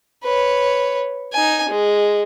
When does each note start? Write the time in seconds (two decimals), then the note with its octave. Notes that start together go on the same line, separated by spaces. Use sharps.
0.24 B4 C#5
1.33 D#4 G#5
1.69 G#3